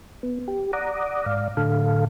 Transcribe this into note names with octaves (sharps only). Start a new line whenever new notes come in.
B3
G4
D5 F#5 A#5 D6 D#6
G#2 D5 F5
A2 D3 A4 F5